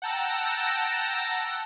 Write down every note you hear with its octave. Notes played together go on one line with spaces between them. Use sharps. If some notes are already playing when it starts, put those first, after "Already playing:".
F#5 G5 A5 A#5 E6 A#6